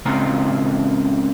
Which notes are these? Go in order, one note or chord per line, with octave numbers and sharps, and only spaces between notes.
C#2 C#3 A#3 C4 A#5